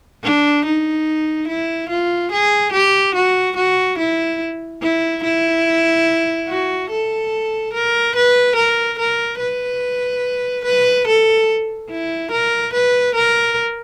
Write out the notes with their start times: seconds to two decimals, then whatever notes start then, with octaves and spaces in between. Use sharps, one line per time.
0.23 D4
0.65 D#4
1.48 E4
1.89 F4
2.32 G#4
2.72 G4
3.15 F#4
3.56 F#4
3.98 E4
4.82 E4
5.23 E4
6.48 F#4
6.90 A4
7.73 A#4
8.15 B4
8.56 A#4
8.99 A#4
9.39 B4
10.65 B4
11.07 A4
11.90 E4
12.32 A#4
12.73 B4
13.15 A#4